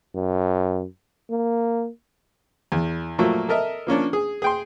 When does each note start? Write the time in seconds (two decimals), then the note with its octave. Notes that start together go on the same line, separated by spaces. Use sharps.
0.15 F#2
1.31 A#3
2.72 E2
3.18 A#2 F3 F#3 A3 A#3
3.49 A4 A#4 D#5 E5
3.87 F3 A#3 C#4 D4
4.13 G#4
4.42 G#4 G5 C6